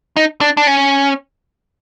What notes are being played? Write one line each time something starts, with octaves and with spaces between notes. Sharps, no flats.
D#4
D4
D4
C#4